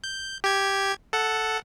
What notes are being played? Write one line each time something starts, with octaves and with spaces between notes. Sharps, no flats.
G6
G4 G#6
A4 F#5